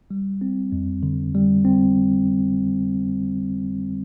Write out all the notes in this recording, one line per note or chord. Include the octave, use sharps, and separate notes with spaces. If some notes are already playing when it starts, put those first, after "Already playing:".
G3
C4
F2
D3
G3
C4